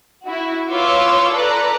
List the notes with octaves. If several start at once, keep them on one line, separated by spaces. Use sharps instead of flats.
E4 F#4
F4 B4 C#5 C#6 D6 E6
A4 B4 D5 A#5 F#6